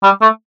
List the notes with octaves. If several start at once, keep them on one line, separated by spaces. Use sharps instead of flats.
G3
A3